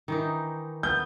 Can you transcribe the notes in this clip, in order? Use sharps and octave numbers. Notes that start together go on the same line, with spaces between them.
D#3 E3 D#4
B3 G6